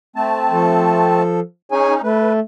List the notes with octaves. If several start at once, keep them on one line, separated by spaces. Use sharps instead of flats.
A3 C4 A5
F3 A4
C#4 D#4 G#4 C#5 G#5
A3 B4